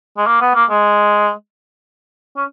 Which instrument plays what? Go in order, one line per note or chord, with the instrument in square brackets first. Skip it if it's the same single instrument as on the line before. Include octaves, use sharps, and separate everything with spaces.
[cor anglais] G#3
A#3
B3
A#3
G#3
C#4